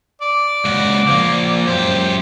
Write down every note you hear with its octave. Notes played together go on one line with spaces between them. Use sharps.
D5
C#2 F#4
F3 A#3
F#2 G4 C5